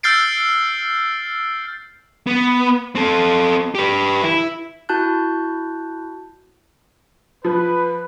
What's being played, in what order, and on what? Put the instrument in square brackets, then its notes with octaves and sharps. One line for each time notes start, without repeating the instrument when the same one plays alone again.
[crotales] E6 F6 G6 A6 C7 D7
[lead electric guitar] B3
C4 A4
G4 B4
E4
[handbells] E4 F#4 A5 F#6 G6
[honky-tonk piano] F3 [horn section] B4